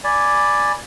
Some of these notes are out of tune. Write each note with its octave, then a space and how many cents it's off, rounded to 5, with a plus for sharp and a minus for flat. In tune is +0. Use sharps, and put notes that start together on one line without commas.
D5 +0 G#5 +0 B5 +0